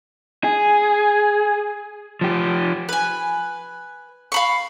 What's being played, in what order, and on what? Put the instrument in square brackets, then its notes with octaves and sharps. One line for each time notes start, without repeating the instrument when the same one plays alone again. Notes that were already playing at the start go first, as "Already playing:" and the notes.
[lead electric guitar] G#4
F3 G4
[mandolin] B4 G#5
F5 B5 C#6